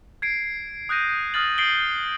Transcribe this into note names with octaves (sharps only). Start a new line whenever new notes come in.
G#6 C7 D7
D#6 F#6 G6 A#6 D#7
D#6 F6 F#6 A6 F#7
G6 A6 C7 D7 F#7 G7